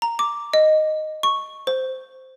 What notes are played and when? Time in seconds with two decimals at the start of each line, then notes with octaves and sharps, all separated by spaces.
0.02 A#5
0.19 D6
0.54 D#5
1.23 C#6
1.67 C5